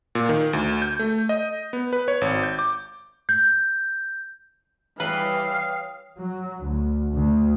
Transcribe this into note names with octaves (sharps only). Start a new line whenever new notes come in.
A#2
D#3
D2
G6
A3
D#5
B3
B4
C#5
G#1
G6
D6
G6
E3 G3 B4 C#5 F5 G5 D#6
F#3
D2
D2